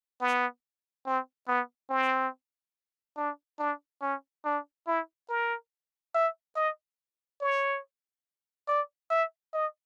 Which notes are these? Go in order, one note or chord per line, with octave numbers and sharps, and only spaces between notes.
B3
C4
B3
C4
D4
D4
C#4
D4
E4
A#4
E5
D#5
C#5
D5
E5
D#5